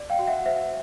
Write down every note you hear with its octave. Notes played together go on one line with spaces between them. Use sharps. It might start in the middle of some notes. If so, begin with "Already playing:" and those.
Already playing: D5
F5 G5
F#4
E5 F#5
C5 E5 F#5